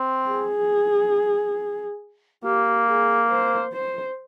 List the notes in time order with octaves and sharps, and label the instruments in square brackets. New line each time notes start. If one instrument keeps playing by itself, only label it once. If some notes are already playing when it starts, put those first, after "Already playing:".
Already playing: [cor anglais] C4
[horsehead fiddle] G#4
[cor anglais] A#3 [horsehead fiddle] G4
[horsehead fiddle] G#4
C5
C5